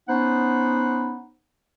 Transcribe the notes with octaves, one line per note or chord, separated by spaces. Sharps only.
B3 C#4 D#4 C5 F#5